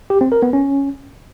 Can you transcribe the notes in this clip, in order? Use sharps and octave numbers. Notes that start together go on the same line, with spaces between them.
G4
C4
A#4
B3
C#4